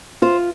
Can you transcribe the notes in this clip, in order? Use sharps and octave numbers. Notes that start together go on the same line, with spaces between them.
F4 C5